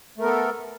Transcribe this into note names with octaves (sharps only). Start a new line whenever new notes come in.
A3 B3 A4 A#4